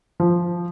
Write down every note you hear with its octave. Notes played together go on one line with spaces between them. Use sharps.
F3